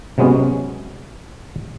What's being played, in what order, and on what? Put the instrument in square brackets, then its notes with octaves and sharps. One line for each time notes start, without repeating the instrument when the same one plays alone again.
[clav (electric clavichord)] C3 F#3 G#3 B3 C#4